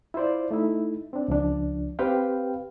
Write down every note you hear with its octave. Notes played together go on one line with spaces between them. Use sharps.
E4 F4 C5 D5
A3 D#4 E4
C4 D4
C#2 F3 D4
C4 G4 B4 F5 G5